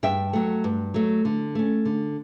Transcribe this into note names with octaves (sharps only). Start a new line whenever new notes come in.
G2 E5 G5
F#3 A3
G2
F#3 A3
D3
A3 C#4
D3